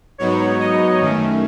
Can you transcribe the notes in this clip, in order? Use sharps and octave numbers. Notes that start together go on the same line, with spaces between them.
G#2 F#3 B3 D#4 C#5
D#5
F#2 D#3 A3 C#4